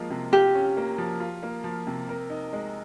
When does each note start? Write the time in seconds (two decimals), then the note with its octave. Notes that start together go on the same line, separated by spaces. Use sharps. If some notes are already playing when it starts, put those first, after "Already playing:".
Already playing: F3 G#3 A#3 F4
0.10 C3
0.32 F4 G4
0.55 C#4
0.77 A#3
0.98 F3
1.20 F4
1.43 A#3
1.64 F3
1.87 C3
2.09 A#4
2.30 D#4
2.53 G#3